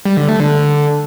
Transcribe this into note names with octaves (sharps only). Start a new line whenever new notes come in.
G3
D3
A3
D3